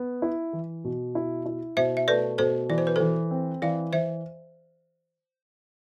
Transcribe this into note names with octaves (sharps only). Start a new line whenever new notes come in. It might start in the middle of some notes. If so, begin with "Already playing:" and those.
Already playing: B3
E4
E3
B2
E4
E4
B2 C5 E5
E5
A3 B4 D5
B2 A4 C5
E3 D5
C5
B4
E3 A4 C5
C4
E3 D5 F5
E3 C5 E5